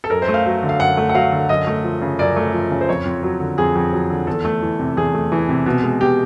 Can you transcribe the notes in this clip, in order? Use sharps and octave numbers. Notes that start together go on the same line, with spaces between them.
A4
F#2 A#4
C5
A3
F5
F#3
D3
F5
F#2 F#5
A3
F#5
F#3 F5
D3
F#2 D#5
A3
F3
C#3
F#2 D5
A3
F3
C#3
C5
F2 C#5
F2
F#3
D3
F2 G#4
F2
F#3
D3
E2 A4
A3
E3
C3
E2 G#4
A3
E3
C3
B2
G#3
B2 G4